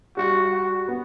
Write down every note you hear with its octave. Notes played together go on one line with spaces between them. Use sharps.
G3 F#4
F#4
B3